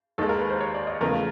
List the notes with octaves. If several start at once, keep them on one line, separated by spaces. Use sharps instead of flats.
D#2 D#3 G#3 A4
A#4
B4
C5
C#5
D5
D#5
E2 C#3 F3 A3 A#4